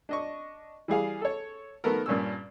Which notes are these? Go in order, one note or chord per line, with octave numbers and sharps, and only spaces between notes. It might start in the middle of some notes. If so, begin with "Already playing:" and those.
D4 D#5 C#6
E3 G3 G#4 F5
A4 C#5
D#3 A3 B3 A4 A#4
G2 A#2 C#4 E6